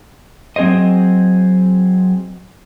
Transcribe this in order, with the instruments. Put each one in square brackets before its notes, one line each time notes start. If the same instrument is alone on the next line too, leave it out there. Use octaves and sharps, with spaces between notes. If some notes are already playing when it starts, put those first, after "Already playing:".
[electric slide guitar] F#3 C4 G#4 C5 D#5